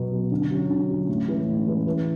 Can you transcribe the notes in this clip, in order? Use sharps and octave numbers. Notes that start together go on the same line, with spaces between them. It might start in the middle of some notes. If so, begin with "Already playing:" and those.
Already playing: B2 F#3 B3
F#3 B3
D3
F#3 C#4 F#4
D3
F#3 C#4 F#4
A2
E3 G#3 C#4
A2
E3 G#3 C#4
E3